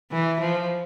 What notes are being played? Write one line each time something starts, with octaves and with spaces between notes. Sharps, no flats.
E3
F3